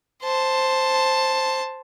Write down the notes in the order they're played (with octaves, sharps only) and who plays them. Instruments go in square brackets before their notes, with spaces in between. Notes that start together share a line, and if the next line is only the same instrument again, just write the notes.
[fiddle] C5 A5